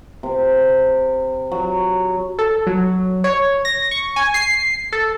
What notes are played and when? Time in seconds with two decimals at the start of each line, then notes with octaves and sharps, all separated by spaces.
0.23 C3
1.52 F#3
2.39 A4
2.67 F#3
3.24 C#5
3.65 A#6
3.91 C#6
4.16 G#5
4.34 C7
4.92 A4